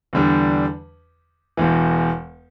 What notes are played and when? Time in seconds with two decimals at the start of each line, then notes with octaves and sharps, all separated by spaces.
0.13 E2 D3 G3 D4
1.57 E1 E2 E3